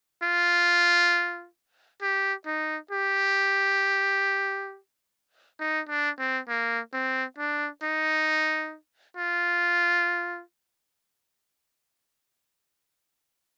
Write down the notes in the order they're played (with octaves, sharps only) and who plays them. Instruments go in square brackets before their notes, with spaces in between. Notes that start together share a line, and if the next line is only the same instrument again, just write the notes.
[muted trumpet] F4
G4
D#4
G4
D#4
D4
C4
A#3
C4
D4
D#4
F4